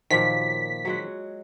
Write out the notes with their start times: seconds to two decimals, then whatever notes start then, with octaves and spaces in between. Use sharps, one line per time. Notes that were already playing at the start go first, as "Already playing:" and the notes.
0.11 A#2 D#3 F3 F#3 B6
0.85 F#3 G#3 F#4